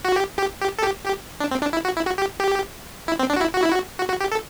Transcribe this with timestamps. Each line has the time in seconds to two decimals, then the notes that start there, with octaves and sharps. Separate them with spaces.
0.05 F#4
0.16 G4
0.39 G4
0.61 G4
0.78 A4
0.83 G4
1.06 G4
1.40 D4
1.51 C4
1.62 D4
1.73 E4
1.85 F#4
1.96 E4
2.07 F#4
2.18 G4
2.40 G4
3.08 E4
3.19 C4
3.30 D4
3.36 F#4
3.41 E4
3.53 F#4
3.62 E4
3.71 F#4
3.98 F#4
4.09 F#4
4.21 G4
4.32 A4